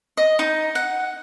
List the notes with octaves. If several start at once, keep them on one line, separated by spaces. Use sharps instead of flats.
D#5
D#4
F#5